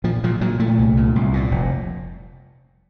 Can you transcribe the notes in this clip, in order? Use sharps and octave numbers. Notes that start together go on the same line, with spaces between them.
A#2 F3
A#2 F3
A#2 F#3
A#2 A3
C2
A#2
C2
A#2
F1